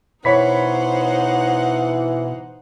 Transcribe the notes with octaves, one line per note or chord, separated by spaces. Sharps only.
B2 E3 D#4 C5 C#5 F#5 B5 B6